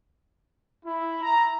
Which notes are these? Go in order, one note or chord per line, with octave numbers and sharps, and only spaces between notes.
E4
A#5